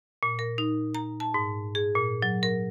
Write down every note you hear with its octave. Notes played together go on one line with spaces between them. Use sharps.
A#2
A#4
D#4
A#5
A5
G#2
G#4
A#2
F#3
A#4